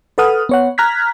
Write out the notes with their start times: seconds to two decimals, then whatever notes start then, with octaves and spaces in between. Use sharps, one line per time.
0.18 A4 B4 F#5 D#6 F6
0.49 B3 C#5 F#5
0.78 A#5 F6 F#6 G#6 B6